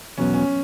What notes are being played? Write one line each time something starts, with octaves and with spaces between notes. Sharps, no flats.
E2 B2 F#3 B3 C#4
C#4